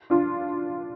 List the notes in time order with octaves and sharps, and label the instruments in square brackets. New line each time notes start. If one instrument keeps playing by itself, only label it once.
[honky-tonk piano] D4 F4